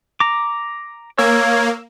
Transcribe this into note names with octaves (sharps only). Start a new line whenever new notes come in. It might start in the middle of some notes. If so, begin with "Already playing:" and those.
A#5 D6
A#3 C#5 E6